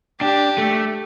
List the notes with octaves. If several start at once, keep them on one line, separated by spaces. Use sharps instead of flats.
D4 G4
A3